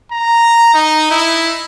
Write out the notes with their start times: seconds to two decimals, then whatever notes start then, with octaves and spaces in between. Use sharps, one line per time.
0.12 A#5
0.74 D#4
1.11 E4